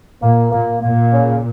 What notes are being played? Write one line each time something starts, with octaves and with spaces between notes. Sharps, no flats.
A#2 A#3
A#2 A#3
A#2 A#3
C#3